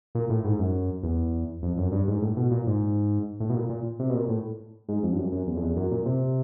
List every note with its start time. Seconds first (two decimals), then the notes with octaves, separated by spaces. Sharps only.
0.15 A#2
0.30 A2
0.45 G#2
0.59 F#2
1.03 E2
1.63 F2
1.78 F#2
1.92 G2
2.08 G#2
2.22 A2
2.37 B2
2.51 A#2
2.67 G#2
3.40 A2
3.50 B2
3.55 A#2
3.69 A#2
3.99 C3
4.09 B2
4.14 A#2
4.28 A2
4.89 G#2
5.03 F2
5.13 G2
5.18 F#2
5.32 F#2
5.47 E2
5.57 F2
5.62 E2
5.76 F#2
5.91 A#2
6.06 C3